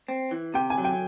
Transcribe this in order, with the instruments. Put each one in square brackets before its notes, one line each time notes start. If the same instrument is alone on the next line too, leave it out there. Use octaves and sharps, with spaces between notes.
[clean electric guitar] C4
E3
[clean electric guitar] C3 [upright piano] G5
[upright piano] G#5
[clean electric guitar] F#3
[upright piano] G5